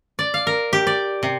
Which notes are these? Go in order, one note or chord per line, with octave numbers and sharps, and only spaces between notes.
D5
F5
A#4
G4
D5
C3